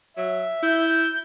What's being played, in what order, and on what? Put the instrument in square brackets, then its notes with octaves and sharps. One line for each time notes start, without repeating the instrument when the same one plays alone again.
[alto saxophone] F#3 [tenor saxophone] E5
[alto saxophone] E4 [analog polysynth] G6